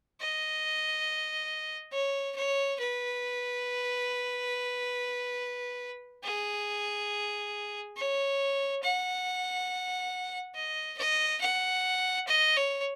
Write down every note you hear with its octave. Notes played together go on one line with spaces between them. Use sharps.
D#5
C#5
C#5
B4
G#4
C#5
F#5
D#5
D#5
F#5
D#5
C#5